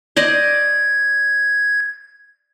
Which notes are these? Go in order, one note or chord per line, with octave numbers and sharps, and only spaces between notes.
C5 D5 D#5 G#6